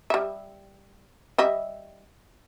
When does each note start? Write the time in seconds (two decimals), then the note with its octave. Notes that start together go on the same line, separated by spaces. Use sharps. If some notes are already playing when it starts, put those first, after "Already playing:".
0.10 G3 E5
1.38 G3 D#5 E5